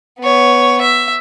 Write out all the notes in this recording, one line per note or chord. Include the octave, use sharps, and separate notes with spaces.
B3 C#5
E5